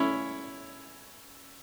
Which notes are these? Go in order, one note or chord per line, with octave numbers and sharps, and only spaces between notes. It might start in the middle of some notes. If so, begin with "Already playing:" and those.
Already playing: C#4 E4